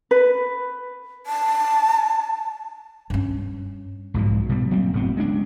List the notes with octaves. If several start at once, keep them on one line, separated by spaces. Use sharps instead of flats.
B4
A5
G2 C#4
B1 G#2 B2 F3
B2 G3
D2 F#3 A#3 C4
F#1 A2 B3 C4
G#3 C#4 D4